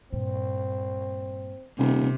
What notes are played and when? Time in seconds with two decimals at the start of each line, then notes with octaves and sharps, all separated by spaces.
0.12 G2 A#2 C4
1.78 D#1 C3